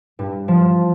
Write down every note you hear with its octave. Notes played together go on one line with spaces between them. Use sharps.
G2
F3